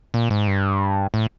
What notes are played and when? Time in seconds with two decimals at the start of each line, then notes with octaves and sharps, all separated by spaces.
0.14 A#2
0.31 G#2
0.47 G2
1.14 A2